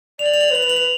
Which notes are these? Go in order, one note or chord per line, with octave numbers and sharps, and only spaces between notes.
D5 F7
F#7
F7
F#7
F7
B4 F#7
F7
F#7
F7